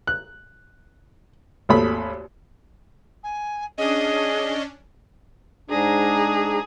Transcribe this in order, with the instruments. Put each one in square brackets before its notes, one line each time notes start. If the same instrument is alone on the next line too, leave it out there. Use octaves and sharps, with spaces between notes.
[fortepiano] F#6
G#1 D#2 A3 B5
[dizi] G#5
[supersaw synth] C#4 D4 [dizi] G#4 [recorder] D#5
[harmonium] G#2 D4 A#5 [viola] G#4